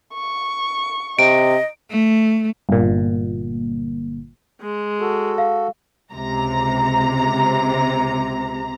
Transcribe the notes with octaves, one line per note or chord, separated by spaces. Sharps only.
C#6
C3 D#5 D7
A3
G1 A#2
G#3
F#4 A4
F5
C#2 C3 A#5